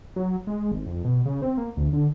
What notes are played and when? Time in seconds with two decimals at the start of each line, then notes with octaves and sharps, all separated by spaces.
0.16 F#3
0.47 G#3
0.72 G#1
0.86 F2
1.04 B2
1.26 C#3
1.42 C4
1.57 A#3
1.77 D2
1.93 D3